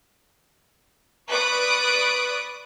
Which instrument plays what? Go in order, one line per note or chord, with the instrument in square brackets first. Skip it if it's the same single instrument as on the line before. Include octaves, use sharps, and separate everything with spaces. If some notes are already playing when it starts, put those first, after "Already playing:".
[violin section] B4 D5 C#6 D#6 F#6 D7